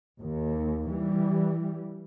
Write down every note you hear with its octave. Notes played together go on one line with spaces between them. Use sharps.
D#2
E3 G3